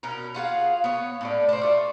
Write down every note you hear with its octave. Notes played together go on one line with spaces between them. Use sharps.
B2 C#4 A#4
F4 F#4 G#4 F5
B3 C#5
A2 C#4 D5
D4 C5
A3 F4